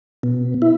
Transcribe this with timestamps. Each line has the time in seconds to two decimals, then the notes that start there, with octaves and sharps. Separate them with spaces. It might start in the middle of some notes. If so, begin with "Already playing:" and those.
0.23 B2
0.62 E4